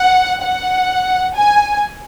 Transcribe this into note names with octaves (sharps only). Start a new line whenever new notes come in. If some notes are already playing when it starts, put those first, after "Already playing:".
Already playing: F#5
F#5
G#5